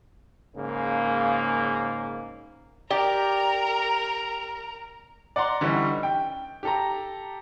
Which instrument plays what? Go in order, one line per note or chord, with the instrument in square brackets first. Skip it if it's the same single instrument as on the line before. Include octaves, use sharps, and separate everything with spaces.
[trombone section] G#2 C#3 A#3
[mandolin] G4 [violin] A#4 A#5 [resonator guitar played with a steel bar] D5
[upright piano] D5 F#5 A#5 C6
D3 E3 G3 C#4 D#4
G5
G4 A4 A#5